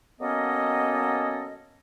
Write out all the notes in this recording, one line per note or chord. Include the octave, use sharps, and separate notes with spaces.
F#3 A#3 B3 C#4 A4 D#5